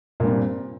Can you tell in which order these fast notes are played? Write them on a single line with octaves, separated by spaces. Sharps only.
A#2 G2 C4